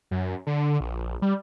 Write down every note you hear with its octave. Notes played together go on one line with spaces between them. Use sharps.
F#2
D3
A#1
G3